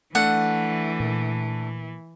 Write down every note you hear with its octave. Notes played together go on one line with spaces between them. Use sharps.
E3 A3 D4 F#5
A#2